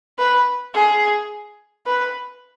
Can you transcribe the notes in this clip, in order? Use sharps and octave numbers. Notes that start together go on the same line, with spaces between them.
B4
G#4
B4